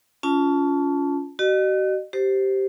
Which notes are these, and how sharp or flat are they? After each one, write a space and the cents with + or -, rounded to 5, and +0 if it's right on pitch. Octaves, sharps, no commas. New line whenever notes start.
C#4 +30 F4 +0 A5 -5
F#4 +45 D#5 -35
G4 -10 C5 +0